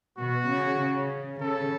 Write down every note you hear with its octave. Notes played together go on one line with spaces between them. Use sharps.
B2 F#4
C#3
C#3
C#3 A4